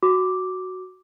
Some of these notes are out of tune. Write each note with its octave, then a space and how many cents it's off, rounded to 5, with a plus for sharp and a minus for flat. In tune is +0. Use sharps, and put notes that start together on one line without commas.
F#4 +0 D6 +0